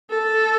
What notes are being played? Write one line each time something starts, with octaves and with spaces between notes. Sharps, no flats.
A4